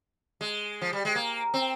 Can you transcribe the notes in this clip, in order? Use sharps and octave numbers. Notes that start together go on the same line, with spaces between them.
G#3
F3
G3
G#3
A#3
C4